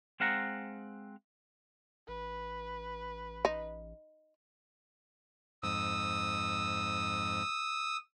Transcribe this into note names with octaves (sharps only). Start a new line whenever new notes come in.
G#3 C4 F5 F#5 A#5
A1 B4
D#4
F2 G#2 D#6 E6